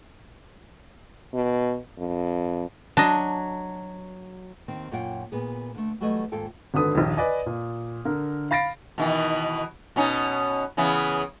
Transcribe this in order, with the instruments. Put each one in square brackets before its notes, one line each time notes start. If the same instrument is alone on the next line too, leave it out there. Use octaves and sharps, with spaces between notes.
[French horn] B2
F2
[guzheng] F#3 [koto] D4 D#5 [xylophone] A5
[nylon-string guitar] D#2 D#3 C4
F#2 A#2 F4 C#5 F#5 G5
A#2 B3 G#4
D3 A3
E3 F#3 G3 A3 B4 D#5
D#2 G#2 F4 A4 G5
[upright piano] G#1 D3 A4 B4 D#6
A#1 D#2
B4 D5 D#5 G#5
A#2
D3 A#4
F5 B5 A6 A#6 C7 D7
[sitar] B2 D#3 E3
B2 C#4 D#4
C#3 E3 B3